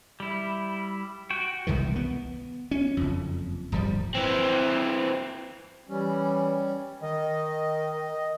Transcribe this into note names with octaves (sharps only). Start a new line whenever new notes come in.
G3 E4
F#4 G5
E1 C2 D#3 E3
B3
C#4
F#1 F2
D1 G1 F3 G3
E3 C4
E3 G3 C#4
D#3 D#5